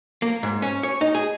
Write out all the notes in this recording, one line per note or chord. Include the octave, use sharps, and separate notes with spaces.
A#3
G#2
C#4
C#5
D#4
G#4